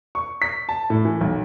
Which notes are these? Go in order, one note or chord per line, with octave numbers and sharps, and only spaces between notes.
C#6
B6
A5
A2
E3
B1